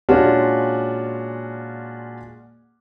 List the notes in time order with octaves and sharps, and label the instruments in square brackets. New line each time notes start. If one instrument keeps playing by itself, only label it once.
[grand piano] A#2 G#3 C#4 D4 F4 F#4